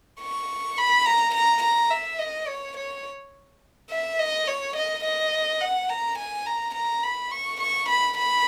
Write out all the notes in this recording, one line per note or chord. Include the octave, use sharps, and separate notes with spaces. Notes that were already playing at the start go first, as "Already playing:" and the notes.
C#6
B5
A#5
A#5
A#5
E5
D#5
C#5
C#5
E5
D#5
C#5
D#5
D#5
F#5
A#5
G#5
A#5
A#5
B5
C#6
C#6
B5
B5